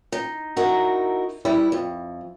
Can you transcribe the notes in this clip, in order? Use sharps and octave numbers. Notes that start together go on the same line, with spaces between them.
D#4
D#4 E4 F#4 A#4
E3 G3 E4
F2